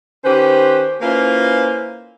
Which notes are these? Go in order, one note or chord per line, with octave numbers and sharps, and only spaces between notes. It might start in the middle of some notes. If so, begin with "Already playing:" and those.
D#3 C#4 G4 B4 C5
A#3 C#4 E4 F4 B4 C5